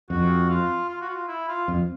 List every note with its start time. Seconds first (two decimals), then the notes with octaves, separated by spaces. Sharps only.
0.10 F2 F#4
0.49 F4
0.89 F4
1.01 F#4
1.09 F4
1.28 E4
1.48 F4
1.68 F2